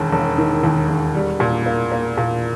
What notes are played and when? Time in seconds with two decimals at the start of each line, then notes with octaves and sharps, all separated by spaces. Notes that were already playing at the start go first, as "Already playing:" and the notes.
Already playing: E1 D#2
0.12 E1
0.38 D#3
0.64 D#2
0.89 E1
1.15 G3
1.40 A#2
1.66 A#3
1.92 A#3
2.18 A#2